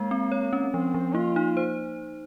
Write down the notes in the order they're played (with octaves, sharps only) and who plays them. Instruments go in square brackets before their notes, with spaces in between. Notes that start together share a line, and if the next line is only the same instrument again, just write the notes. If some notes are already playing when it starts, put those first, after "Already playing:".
Already playing: [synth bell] G#3 [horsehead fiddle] A#3
[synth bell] C4
C#5
C#4
[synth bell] F3 [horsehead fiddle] C4
[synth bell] F3
[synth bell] A#3 [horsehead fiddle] F4
[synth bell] D#4
C5